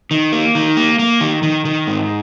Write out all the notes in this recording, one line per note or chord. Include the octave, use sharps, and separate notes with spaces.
D#3
A#3
D#3
A#3
A#3
D#3
D#3
D#3
G#2